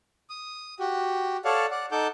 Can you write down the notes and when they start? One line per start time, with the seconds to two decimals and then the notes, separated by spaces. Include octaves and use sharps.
0.30 D#6
0.80 F#4 G4
1.45 A4 C#5 D5 F5 F#5
1.71 D5 F#5
1.92 D#4 A4 F#5 D6 G6